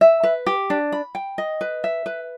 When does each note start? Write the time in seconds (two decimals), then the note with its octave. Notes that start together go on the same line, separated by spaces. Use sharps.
0.01 E5
0.23 B4
0.46 G4
0.70 D4
0.92 B5
1.15 G5
1.38 D#5
1.61 B4
1.84 E5
2.06 B4